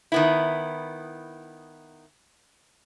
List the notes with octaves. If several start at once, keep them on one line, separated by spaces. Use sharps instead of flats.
D#3 B3 E4